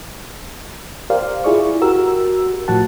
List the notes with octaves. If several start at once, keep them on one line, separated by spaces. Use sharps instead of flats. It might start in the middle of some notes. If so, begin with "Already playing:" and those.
G4 A#4 C5 D5 F5
E4 F4 G#4 D5 C#6
F#4 G4 A#4 E6
A2 F3 F#4 F#5 A5